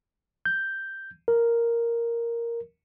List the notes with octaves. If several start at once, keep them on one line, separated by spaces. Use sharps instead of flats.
G6
A#4